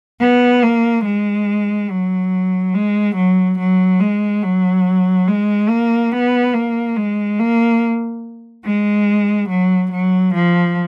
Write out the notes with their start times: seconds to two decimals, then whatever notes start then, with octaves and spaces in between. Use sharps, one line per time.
0.20 B3
0.63 A#3
1.05 G#3
1.90 F#3
2.74 G#3
3.16 F#3
3.59 F#3
4.00 G#3
4.43 F#3
5.27 G#3
5.69 A#3
6.12 B3
6.54 A#3
6.96 G#3
7.39 A#3
8.65 G#3
9.50 F#3
9.91 F#3
10.34 F3